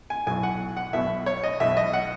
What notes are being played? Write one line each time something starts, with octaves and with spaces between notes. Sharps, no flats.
G#5
B1 A2 F#3 G#5
F#5
F#5
B1 B2 F#3 E5
C#5
D#5
B1 B2 F#3 E5
D#5
F#5